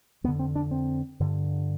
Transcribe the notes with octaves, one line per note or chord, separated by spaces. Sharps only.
F2 D3 B3
C4
D4
C4
G2 D3